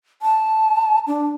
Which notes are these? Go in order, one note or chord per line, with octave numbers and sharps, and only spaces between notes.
A5
D4